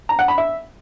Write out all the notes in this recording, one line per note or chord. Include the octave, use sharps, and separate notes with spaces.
A#5
F#5
B5
E5